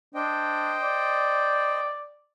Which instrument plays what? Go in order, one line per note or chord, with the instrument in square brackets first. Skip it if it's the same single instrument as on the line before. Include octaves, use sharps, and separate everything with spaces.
[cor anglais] D4 [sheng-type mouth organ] C5 D#5 G5
[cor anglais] D5